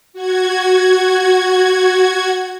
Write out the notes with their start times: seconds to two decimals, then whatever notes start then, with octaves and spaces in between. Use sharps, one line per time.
0.13 F#4 G#6